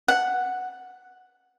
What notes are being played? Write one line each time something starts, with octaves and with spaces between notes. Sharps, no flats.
F#5